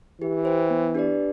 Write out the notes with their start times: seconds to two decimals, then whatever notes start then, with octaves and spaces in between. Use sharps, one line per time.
0.21 E3 G4
0.45 C5 G5
0.70 B3
0.94 D4 G4 B4 D5